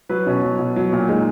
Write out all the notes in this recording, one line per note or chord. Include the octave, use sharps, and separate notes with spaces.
F#3 B4
B2 C#4
F#3
B2
F#3
A#2
G#3 D#4